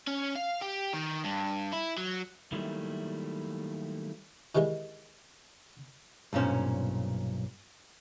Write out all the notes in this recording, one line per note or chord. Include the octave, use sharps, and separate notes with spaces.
C#4
F5
G4
D#3
G2
E4
F#3
D#3 F#3 G3 A3 A#3 E4
D#3 E3 G3 G#3
B1 G2 A#2 C#4 C5